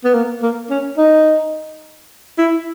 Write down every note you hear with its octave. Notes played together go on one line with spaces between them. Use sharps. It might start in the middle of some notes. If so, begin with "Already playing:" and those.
B3
A#3
A#3
C#4
D#4
E4